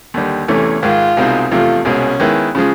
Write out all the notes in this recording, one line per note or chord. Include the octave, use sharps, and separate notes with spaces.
D#2 D3 G3
E2 C3 E3 A3 C#4
G#2 D#3 G#3 F4
C2 B2 G#3 C4 D#4
E2 C3 F3 A3 F4
C2 B2 G#3 C#4
D#3 G#3 B3 E4
C#3 F3 G#3